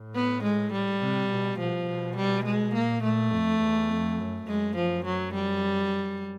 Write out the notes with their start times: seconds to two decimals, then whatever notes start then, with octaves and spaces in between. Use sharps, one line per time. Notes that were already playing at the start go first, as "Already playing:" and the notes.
Already playing: A2
0.15 B3
0.43 G#3
0.72 G3
1.01 C3
1.30 B2
1.58 B2 F3
1.87 B2
2.16 G3
2.45 G#3
2.74 A#2 A#3
3.03 A#2 A3
3.32 F2
3.60 E2
3.90 F2
4.18 F#2
4.47 F#2 G#3
4.76 F3
5.05 F#3
5.34 G3